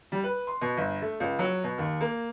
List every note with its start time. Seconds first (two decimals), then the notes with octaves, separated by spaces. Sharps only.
0.12 G3
0.23 B4
0.47 C6
0.61 B2
0.77 G1
1.02 A3
1.20 C#2
1.39 F#3
1.64 B2
1.78 D#2
2.01 A#3